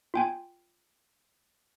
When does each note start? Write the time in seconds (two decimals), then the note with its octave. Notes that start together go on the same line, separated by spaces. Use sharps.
0.14 F4 G5 G#5